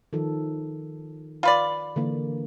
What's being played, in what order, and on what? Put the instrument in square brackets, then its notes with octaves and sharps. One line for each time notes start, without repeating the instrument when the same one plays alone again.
[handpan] D#3 F3 A4
[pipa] F4 B4 D5
[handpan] D3 E3 A#3